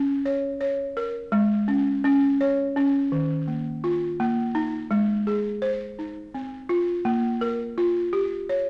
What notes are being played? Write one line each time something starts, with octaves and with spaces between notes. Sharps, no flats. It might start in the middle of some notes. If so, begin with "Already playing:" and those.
Already playing: C#4
C#5
C#5
A#4
G#3
C#4
C#4
C#5
C#4
D#3
A#3
F4
A#3
D#4
G#3
G#4
C5
D#4
C4
F4
A#3
A#4
F4
G4
C#5